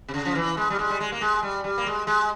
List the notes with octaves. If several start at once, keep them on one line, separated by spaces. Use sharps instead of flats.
C3
C#3
F3
E3
G#3
G3
G#3
G3
G#3
A#3
G#3
G3
G3
A#3
G#3
G#3